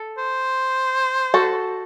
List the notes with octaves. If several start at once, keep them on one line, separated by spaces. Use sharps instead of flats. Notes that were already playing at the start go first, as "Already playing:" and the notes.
Already playing: A4
C5
F#4 A4